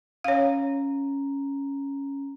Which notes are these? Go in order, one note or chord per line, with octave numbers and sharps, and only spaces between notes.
C#4 C#5 F5 A#5